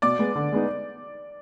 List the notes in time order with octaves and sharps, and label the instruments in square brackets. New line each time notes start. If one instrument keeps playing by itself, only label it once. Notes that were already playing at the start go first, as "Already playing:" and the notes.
[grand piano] B2 [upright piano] D5 D6
[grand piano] G#3 B3
D3
G#3 B3 D#4